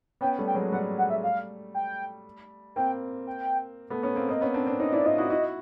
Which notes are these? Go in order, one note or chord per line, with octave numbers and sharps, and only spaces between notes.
B3 C#4 G5
G3 A3
G5
F#3 G#3
G3 A3 F#5
F#5
E5
F5
G5
A#3 C4 G5
G5
A3 B3
B3 C#4
A#3 C4
A#3 C4 D#5
B3 C#4
C4 D4
C4 D4
C#4 D#4 D#5
D4 E4 D5
D#4 F4 D#5
E4 F#4
E4 F#4